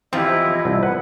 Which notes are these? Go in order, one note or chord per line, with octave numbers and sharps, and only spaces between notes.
E2 F3 C4 E4 F4 G4 D#5
C2
B4 F#5